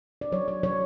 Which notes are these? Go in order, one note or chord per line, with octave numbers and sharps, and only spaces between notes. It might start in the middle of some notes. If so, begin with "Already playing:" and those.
D5
F#3 C#5
C#5
F#3 C#5